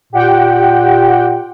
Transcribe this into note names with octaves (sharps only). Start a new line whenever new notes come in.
A#2 G4 F#5 G5